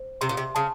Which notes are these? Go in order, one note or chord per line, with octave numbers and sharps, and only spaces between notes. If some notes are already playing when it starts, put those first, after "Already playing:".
Already playing: C5
C3 C6
A#2
C3
C#3 A5